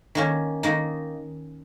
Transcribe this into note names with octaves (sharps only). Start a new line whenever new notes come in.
D#3 A#3 C#4
D#3 A#3 D#4